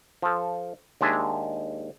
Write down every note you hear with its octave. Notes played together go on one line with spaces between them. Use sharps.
F3 A4
D#2 G#3 D4 E5 G#5